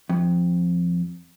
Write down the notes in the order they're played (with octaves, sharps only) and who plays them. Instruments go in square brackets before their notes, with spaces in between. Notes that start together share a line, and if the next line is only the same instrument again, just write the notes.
[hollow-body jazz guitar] F2